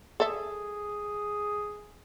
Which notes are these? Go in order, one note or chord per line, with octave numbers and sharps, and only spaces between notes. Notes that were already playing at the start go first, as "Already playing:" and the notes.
G#4 A4 E5